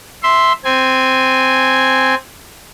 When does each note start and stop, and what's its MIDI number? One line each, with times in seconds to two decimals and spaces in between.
0.23 0.52 76
0.23 0.52 84
0.64 2.14 60
0.64 2.14 80